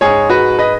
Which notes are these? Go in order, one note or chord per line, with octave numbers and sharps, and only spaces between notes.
G#2 G#3 G#4 C#5
F#4 B4
B4 D#5